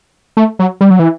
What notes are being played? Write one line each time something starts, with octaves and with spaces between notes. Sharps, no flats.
A3
F#3
G3
F#3
E3